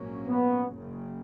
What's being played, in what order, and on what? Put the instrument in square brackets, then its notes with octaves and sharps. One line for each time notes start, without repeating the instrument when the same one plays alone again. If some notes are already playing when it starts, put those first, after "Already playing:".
Already playing: [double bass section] A#1 G#2 F#3 A#3 C#4
[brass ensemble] B3
[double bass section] F#1 F#2 C#3